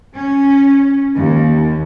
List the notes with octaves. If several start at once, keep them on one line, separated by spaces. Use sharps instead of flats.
C#4
D#2